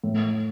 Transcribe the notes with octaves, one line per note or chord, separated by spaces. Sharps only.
A2